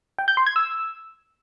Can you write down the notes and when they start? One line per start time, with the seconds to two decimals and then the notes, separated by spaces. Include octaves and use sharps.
0.19 G5
0.28 G6
0.37 C6
0.46 G#6
0.56 E6